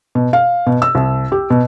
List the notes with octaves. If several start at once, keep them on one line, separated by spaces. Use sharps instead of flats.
B2
F5
B2
E6
C2
G4
B2